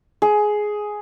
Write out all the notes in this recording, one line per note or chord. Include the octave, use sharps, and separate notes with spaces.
G#4